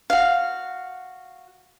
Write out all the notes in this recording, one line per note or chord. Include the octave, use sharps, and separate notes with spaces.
F#4 F5